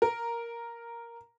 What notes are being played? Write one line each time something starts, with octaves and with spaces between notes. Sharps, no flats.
A#4